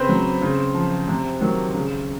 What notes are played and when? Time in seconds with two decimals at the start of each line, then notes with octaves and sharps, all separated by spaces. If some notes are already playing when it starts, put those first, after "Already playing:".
Already playing: C#3 C4 B4 C5
0.09 F#3
0.42 C#3
0.75 F3
1.08 C3
1.41 D#3 F#3
1.74 C#3